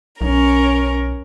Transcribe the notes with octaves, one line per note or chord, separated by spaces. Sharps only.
B1 C#4 A#4